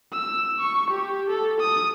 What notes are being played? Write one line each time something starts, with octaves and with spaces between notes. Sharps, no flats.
E6
C#6
G4
A4
D#6